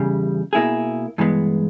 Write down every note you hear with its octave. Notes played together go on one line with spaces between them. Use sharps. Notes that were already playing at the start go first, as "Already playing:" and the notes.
Already playing: E2 C#3 G3
B2 A#3 E4 G#4
G2 E3 G#3 B3